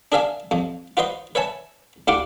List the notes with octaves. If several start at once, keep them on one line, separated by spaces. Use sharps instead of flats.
D4 G#4 A#4 E5 F5 G#5
F2 F3
F4 F#4 B4 C5 D#5 C6
B4 C#5 E5 G#5 A5
D2 E4 G4 F5 F#5 D6